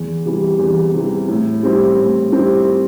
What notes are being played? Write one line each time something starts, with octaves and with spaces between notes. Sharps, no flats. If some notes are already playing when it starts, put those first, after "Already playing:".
Already playing: E2
C3 E3 G3
E2
C3 E3 G3
A2
G3 C4 E4
A2
G3 C4 E4